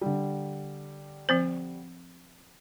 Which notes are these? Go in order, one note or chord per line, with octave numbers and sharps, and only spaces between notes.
D3 G3
F3 C4 C5